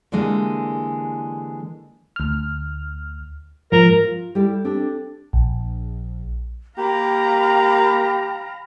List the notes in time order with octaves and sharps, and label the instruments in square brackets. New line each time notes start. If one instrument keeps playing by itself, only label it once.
[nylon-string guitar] D3 E3 G3 G#3 A#3
[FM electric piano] D2 F6
[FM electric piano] G#2 F3 [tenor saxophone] A#4
[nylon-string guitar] F4
G3 E4 G4 A4 D5
C4 D4 G4 A4
[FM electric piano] A#1
[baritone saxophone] A#3 [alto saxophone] G4 [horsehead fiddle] F5 A#5 [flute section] G5 B5